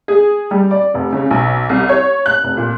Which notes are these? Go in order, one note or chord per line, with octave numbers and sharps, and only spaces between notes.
G#4
G3
D5
F1
C#3
B1
C2
C#5
F#6
F1
A#2